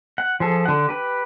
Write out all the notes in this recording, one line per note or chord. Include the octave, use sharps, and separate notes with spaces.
F#5
F3 G#4 A4
D3 F#5
G4 B4